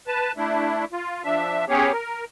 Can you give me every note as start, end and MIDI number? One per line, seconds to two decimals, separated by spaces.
0.07 0.32 71
0.07 0.32 81
0.37 0.85 57
0.37 0.85 62
0.37 0.85 64
0.92 1.23 65
1.24 1.65 53
1.24 1.65 62
1.24 1.65 76
1.69 1.92 59
1.69 1.92 61
1.69 1.92 67
1.69 1.92 68
1.69 1.92 73
1.92 2.24 70